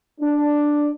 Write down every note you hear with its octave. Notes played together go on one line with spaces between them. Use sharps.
D4